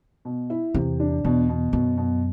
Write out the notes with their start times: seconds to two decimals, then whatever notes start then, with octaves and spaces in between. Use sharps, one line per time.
0.25 B2
0.50 E4
0.74 E2 C3
1.00 D4
1.24 E2 B2
1.49 B2
1.73 F#2 B2
1.98 B2